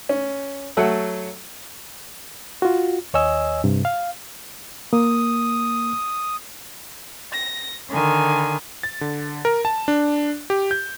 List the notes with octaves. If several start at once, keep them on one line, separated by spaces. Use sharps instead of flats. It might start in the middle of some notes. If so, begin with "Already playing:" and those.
C#4
F#3 A3 A4 F#5
F4 F#4
D#2 C#5 D#5 G#5 E6
G2 C3
F5
A#3 D#6
A#6
D3 D#3 G#5
A6
D3
A#4
A5
D4
G4
G6